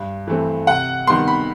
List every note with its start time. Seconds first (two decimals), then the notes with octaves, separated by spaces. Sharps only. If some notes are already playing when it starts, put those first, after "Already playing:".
Already playing: G2
0.27 E3 A3 C4
0.67 C3 F#5
1.07 D#3 G3 B3 C6
1.28 B5